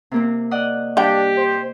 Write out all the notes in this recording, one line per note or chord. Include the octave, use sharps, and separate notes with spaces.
C3 A#3 C4
D5 D#5 F#5
G3 D4 G4 F5 G5
C5